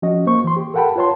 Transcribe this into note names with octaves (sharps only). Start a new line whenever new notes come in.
F3 C#4 F#4 D#5
A#3 C5 C#6
E3 C6
G4
A4 A#4 F#5 G5 A5 B5
F4 B4 C#5 A5 C6